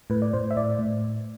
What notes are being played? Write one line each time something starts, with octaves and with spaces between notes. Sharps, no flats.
A2 B4
D5
A2 C5
E5
A2 D5
A2